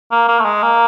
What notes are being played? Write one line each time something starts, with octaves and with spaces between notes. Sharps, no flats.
A#3
A#3
A3
G#3
A#3